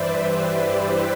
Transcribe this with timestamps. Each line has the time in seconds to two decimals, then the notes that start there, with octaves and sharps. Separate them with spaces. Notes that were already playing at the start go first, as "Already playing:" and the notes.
Already playing: G2 E3 B4 C5 D5 E5
0.27 G4 B4
0.78 E4 G4